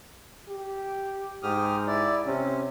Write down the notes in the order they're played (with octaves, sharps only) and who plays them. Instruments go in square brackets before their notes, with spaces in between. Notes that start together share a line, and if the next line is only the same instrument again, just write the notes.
[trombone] G4
[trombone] G#2 [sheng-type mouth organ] G4 D#6 F6
[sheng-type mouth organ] E4 D5
[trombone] C3 [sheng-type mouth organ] C#4